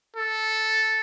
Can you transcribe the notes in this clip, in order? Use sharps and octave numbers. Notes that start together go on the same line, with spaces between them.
A4